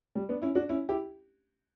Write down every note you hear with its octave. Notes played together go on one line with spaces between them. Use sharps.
G3
B3 D4
C#4 E4
D4 F#4
C#4 E4
E4 G4